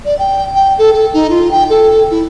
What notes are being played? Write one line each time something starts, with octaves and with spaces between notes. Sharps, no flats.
D5
G5
G5
A4
A4
D#4
F4
G5
A4
E4